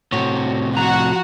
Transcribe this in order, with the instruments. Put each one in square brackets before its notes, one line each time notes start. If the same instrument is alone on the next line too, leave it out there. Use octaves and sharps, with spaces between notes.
[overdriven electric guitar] A2 C3 [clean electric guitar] F#4 C#5
[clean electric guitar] F3 A#5 [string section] F#4